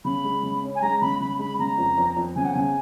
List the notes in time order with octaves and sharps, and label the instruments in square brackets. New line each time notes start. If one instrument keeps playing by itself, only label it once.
[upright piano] C#3 [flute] B5
[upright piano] G#3
C#3
C#4
[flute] G#5
[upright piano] G#3 [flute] A#5
[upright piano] C#3 [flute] B5
[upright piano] C#3 [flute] B5
[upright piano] G#3 [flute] B5
[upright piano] C#3 [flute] A#5
[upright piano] F2
F2
F2
[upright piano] C#3 [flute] G#5
[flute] F#5
[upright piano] C#3 [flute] G#5